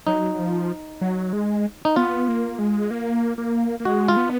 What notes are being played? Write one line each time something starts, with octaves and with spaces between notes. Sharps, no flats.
F#3 D#4
F3
F#3
G#3
D#4
B3 F4
A#3
G#3
A#3
A#3
A#3
G#3 F#4
F4
B3